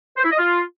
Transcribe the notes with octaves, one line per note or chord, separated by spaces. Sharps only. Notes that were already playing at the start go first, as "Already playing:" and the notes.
C5
E4
D#5
F4